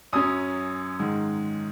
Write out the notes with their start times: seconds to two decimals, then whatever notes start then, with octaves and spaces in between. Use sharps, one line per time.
0.13 F#2 F#3 C#4 D#6
0.99 G#2 D#3 G#3